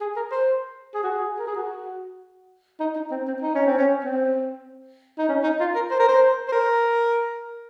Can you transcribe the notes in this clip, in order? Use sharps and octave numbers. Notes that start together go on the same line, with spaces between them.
G#4
A#4
C5
G#4
F#4
G#4
A#4
G#4
F#4
D#4
D#4
C4
C4
D#4
C#4
C4
C#4
C4
D#4
C#4
D#4
F4
A#4
C5
A#4
C5
C5
A#4